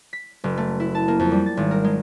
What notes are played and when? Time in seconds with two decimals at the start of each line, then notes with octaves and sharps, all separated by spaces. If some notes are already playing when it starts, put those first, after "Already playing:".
0.13 B6
0.44 F#1
0.57 A3
0.80 E4
0.95 A5
1.08 A#3
1.20 F2
1.32 G3
1.46 A6
1.57 G#1
1.71 A#4
1.84 G#3